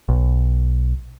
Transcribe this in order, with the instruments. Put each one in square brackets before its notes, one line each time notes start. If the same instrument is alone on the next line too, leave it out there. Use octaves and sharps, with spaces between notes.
[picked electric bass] B1